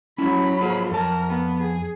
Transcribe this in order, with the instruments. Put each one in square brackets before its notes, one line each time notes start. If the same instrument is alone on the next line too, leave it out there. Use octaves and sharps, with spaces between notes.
[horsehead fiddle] F#3 B5 [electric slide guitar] C#4 E4
[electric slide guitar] F4 G#4 C5
[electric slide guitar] F2 A5 [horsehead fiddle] A#4
[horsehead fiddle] B3
G#4